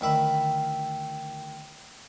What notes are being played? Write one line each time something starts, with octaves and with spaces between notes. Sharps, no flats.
D2 D#3 E5 B5